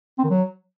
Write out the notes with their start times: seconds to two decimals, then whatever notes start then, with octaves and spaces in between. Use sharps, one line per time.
0.19 C4
0.24 D#3
0.30 F#3